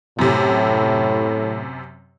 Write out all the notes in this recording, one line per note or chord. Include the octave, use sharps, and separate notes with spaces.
F#2 A2 C3